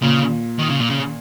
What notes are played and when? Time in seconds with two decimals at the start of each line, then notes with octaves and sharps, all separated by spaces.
0.02 A#2 C#3
0.59 D#3
0.70 C#3
0.80 A#2
0.90 C#3